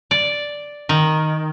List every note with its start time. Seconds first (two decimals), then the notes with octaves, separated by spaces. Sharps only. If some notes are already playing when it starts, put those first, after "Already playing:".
0.11 D5
0.89 D#3